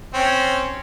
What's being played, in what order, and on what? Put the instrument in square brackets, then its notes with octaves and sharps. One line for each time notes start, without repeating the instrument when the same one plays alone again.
[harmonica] C4 C#4